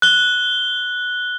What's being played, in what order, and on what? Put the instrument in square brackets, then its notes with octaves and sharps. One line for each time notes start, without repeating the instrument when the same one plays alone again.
[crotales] F#6 G7